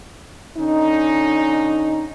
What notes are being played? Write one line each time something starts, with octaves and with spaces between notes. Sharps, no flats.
D3 C#4 D#4